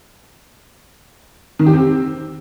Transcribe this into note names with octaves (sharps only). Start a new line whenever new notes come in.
D#3
G4
C4